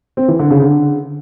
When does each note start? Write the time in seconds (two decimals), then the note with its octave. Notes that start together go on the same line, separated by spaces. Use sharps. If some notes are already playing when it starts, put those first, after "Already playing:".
0.17 C4
0.28 E3
0.39 D3
0.51 C#3
0.62 D3